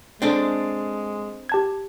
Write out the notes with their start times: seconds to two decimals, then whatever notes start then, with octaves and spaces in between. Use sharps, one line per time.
0.22 G#3 C4 D4 A4
1.49 G4 A5 G#6